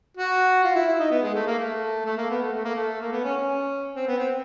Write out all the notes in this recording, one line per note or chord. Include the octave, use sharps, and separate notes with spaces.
F#4
F4
E4
E4
D#4
B3
G#3
A3
A#3
A3
A3
A#3
B3
A3
A3
A#3
A3
A#3
B3
C#4
C#4
C4
B3
C4